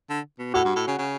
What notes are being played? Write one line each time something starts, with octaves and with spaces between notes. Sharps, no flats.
D3
B2
A2 F#4
G2
A2
C#3
C#3